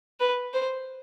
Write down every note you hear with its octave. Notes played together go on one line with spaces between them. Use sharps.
B4
C5